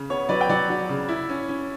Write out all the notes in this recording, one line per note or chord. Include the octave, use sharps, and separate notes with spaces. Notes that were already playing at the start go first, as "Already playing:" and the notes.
Already playing: C#3
B3 C#5
F#3 B4 D5
G5
F#3 D5 F#5
F#3
C#3
E4
C#4
C#4